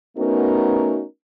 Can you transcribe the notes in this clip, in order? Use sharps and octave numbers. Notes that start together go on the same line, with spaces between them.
A3 B3 C#4 D#4 F#4 A#4